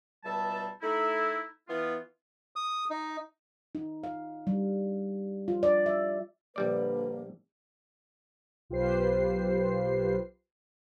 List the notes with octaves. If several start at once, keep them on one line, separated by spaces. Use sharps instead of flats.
C#2 B2 G3 E5 A5
A3 D#4 E4
E3 B3 F4
D#6
D#4
D#4
F5
G3
F4
D5
E5
A#1 D3 G3 A#3 B4 D5
B1 F4 G4 B4 C5 C7